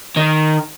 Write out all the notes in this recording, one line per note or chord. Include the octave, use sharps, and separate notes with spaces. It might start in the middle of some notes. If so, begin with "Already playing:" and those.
D#3